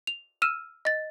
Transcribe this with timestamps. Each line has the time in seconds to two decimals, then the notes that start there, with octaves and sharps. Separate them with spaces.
0.07 F7
0.42 E6 F6 D#7 E7
0.85 D#5 A6